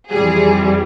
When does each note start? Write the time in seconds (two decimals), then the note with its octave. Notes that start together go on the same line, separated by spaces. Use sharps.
0.11 F2 E3 G3 G#4